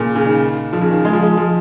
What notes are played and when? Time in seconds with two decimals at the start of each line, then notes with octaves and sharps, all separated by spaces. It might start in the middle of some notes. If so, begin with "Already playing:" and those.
Already playing: A#2 C#3
0.16 C#3
0.26 D#3
0.73 F3
0.81 C#3
0.90 D#3
1.05 G#3
1.13 F3
1.22 G#3
1.37 F3